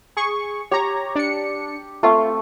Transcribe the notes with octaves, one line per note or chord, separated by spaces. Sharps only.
G#4 C#6
G4 C#5 A#5
D4 C#7
A3 C4 F4